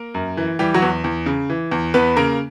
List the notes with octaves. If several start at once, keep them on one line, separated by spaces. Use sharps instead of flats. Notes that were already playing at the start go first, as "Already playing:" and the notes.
Already playing: A#3 A#4
F#2
E3
E3 G3 G4
F#3 F#4
E2
E2
C#3
E3
E2
E2 B3 B4
C#3 A#3 A#4